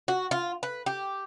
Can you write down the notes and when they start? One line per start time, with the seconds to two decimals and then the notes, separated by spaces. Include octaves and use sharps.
0.08 F#4
0.31 F4
0.63 B4
0.86 G4